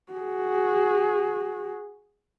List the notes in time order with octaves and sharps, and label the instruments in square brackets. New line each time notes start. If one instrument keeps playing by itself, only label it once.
[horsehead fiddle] F#4 G#4